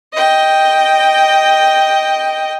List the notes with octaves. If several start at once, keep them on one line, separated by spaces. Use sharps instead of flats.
D#5 G5